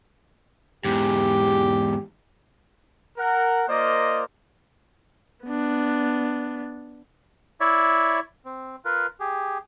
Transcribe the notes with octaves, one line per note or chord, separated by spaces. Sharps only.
E2 G#2 G4
A#4 F#5
A#3 F4 A#4 C5 D5 D#5
B3 D4
E4 C#5 D5 E5
C4
F4 A#4 B4
G4 G#4